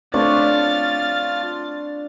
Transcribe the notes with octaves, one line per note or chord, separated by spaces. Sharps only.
A3 C4 D4 F4 C#5 C#6 F6 A6